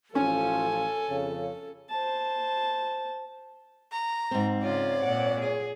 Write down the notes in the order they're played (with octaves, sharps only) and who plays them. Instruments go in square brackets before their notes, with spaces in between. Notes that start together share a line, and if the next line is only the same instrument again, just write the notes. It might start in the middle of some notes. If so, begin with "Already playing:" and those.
[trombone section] A1 F3 F4 [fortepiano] C#4 [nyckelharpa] A4 [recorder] G#5
[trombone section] F2 C#3
[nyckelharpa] C5 A5
[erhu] A#5
[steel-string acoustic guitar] G#2 C4
[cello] C#3 F4 [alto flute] C#5 [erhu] D5
[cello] A#2 F#5
G#4